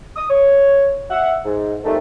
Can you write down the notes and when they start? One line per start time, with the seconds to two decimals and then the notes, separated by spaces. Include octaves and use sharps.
0.16 D#6
0.30 C#5
1.11 E5 F#5
1.45 G#2
1.84 F2 G#2 C3 D#3 G3 A3